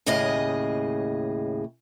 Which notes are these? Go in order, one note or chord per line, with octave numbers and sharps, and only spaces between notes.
D#2 A2 C#3 G#4 D#5